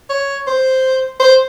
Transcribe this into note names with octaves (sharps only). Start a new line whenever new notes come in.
C#5
C5
C5